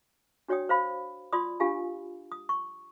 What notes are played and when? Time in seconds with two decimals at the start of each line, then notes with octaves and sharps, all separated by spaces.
0.48 D4 F#4 C#5 D5 G5 D#6
0.69 C5 F5 B5
1.33 F4 D5 B5 C6 D#6
1.60 D4 F4 G4 F5 G#5
2.32 D#6
2.49 C#6